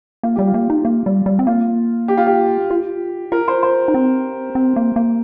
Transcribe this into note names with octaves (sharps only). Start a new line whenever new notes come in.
A#3 F4
G3 G4
F4
A#3
D#4
A#3
G3
G3
C4
A#3 F4
G4
F4
G4
F4
F4 A#4
C5
C5
D#4
C4
C4
A#3
A#3